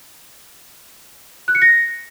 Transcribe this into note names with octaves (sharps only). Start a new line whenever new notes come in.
F#6
C#7
A#6